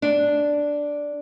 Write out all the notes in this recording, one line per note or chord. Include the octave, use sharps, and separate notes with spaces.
D4